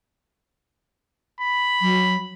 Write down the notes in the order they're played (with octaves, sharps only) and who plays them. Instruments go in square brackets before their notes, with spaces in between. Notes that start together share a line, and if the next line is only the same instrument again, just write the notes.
[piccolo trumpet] B5
[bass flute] F#3